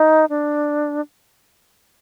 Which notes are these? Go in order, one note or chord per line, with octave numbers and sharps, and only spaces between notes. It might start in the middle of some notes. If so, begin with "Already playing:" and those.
Already playing: D#4
D4